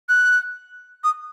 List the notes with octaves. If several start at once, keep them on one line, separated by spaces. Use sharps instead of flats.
F#6
D#6